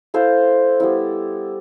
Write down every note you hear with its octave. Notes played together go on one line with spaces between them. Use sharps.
E4 A4 C5 F5
G3 B3 E4